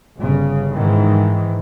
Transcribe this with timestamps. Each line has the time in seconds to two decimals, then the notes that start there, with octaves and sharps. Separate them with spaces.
0.19 G1 C#3
0.72 G#2 D#3 E3